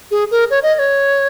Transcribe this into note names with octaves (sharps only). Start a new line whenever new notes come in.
G#4
A#4
C#5
D#5
D#5
C#5